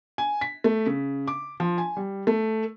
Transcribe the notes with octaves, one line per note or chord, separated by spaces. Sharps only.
G#5
B6
A3
C#3
D6
F3
G#5
G3
A3